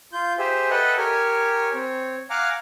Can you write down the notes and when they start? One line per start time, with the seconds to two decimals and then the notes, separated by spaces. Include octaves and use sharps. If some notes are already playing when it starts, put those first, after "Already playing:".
0.13 F4 G6
0.38 G4 G#4 C5 E5
0.70 A4 B4 D#5 E5 F#5 G5
0.98 G4 A#4 C#5 G#5
1.74 C4 C#5
2.30 F5 F#5 G#5 A#5 D6